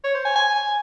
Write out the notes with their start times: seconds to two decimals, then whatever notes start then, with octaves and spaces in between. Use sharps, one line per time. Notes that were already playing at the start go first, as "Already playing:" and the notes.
0.04 C#5
0.15 C5
0.25 G#5
0.36 G#5